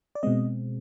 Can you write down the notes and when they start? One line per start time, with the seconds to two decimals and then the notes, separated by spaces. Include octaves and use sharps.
0.15 D5
0.23 B2 G#3 C4 D#5